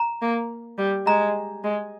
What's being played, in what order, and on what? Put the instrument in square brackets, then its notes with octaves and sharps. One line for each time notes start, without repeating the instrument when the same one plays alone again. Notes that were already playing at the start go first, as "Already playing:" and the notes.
Already playing: [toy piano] A#5
[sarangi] A#3
G3
[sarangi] G#3 [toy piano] A#5
[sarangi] G#3